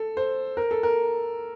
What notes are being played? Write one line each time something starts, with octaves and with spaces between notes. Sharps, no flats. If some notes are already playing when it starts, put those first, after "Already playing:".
Already playing: A4
C5
A#4
A4
A#4